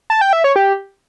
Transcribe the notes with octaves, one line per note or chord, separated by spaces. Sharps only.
A5
G5
E5
C#5
G4